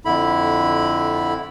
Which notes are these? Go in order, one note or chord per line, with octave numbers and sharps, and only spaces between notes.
F2 D3 E4 B5